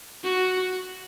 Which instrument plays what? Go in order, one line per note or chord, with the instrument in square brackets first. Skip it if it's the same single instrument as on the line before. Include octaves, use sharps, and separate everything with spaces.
[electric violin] F#4